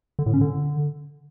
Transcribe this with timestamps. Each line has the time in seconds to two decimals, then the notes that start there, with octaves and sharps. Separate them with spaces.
0.19 D3
0.26 A2
0.34 C#4
0.41 D3